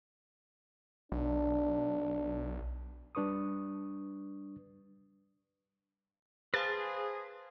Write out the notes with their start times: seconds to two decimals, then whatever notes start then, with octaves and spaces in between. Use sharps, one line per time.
1.12 B1 D4
3.15 G3 D4 B4 C#6 D#6
6.54 G#4 B4 C5 F5 A5 C6 A6